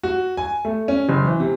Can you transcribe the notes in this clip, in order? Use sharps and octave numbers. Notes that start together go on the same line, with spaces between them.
F#4
G#5
A3
C#4
F#1
E3
C3